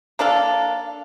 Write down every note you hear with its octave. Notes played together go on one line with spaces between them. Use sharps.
A#3 D4 A4 F5